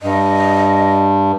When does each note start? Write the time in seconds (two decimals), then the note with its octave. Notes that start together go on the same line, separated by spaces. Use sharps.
0.02 G2 D#5